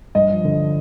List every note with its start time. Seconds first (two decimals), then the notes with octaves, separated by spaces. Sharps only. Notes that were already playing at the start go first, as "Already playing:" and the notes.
0.15 G2 D#5
0.29 F3
0.45 D3